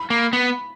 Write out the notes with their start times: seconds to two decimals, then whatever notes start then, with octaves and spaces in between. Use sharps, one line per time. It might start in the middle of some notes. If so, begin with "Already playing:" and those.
Already playing: B5
0.10 A#3
0.33 B3